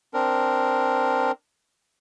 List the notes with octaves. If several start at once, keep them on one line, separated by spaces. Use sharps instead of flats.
C4 D4 A#4